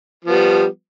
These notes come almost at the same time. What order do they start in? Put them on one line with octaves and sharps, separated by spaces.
F3 B3 G3